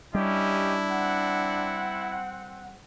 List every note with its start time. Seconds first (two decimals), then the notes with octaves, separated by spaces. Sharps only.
0.14 G3 C#4 D4 E4 G4 D#5
0.91 C4 F#5